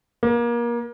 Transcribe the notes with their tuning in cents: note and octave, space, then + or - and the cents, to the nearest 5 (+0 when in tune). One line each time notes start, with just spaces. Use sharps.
A#3 +30